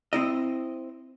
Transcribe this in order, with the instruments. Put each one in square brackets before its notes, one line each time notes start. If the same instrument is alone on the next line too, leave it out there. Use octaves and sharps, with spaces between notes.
[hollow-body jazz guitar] C4 E4 D#5